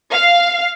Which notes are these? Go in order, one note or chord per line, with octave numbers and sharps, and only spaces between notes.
F5